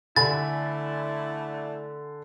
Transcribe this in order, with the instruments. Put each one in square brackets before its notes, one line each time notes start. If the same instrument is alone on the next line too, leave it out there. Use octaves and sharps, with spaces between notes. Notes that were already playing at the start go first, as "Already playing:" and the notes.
[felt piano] D3 [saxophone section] A3 D4 E4 [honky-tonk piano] G#5 B5 [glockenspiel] A6